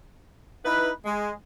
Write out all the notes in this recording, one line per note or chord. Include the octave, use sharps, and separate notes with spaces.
D#4 E4 B4
G#3